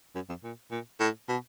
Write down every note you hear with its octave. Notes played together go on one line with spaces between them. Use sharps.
F#2
F2
A#2
A#2
A2
B2